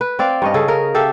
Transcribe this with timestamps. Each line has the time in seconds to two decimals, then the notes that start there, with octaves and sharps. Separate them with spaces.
0.01 B4
0.19 C4 D5 F5
0.42 G2 C#4 D#5
0.54 C#3 G#4 A4
0.68 A#4
0.95 G4 A4 E5 F5